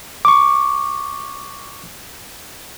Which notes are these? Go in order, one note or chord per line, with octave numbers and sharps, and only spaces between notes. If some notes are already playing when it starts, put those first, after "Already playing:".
C#6 D6